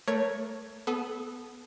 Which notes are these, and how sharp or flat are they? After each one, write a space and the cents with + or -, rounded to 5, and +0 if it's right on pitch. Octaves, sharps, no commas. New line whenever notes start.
A3 +10 A#4 +25 C#5 +0
B3 +0 A4 -30 D#6 +0